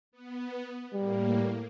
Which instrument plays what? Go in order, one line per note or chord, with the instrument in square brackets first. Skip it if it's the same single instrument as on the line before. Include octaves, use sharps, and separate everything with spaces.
[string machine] B3
[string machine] A2 A#3 [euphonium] G3